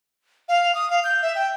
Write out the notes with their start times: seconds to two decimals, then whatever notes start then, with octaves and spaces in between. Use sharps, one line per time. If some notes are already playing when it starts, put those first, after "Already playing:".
0.49 F5
0.75 D#6
0.90 F5
1.04 G6
1.22 E5
1.35 G5